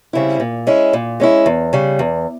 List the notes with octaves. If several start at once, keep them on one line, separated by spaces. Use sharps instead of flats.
C#3 G3 C4 E4
A#2
G#3 C#4 E4
A#2
G#3 C#4 E4
E2
C#3 G3
E2